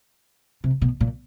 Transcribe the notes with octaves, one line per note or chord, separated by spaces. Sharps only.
C3
B2
A#2